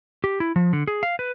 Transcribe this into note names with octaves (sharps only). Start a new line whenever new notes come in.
G4
E4
F3
D3
G#4
F5
B4